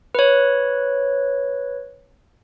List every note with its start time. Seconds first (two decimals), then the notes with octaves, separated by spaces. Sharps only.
0.15 B4 C#5